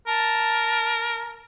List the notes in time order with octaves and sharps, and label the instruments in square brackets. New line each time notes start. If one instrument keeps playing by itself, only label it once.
[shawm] A#4 [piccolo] A5